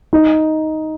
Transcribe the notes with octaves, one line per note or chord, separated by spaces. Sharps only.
D#4